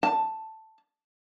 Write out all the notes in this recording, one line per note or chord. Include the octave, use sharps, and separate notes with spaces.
A5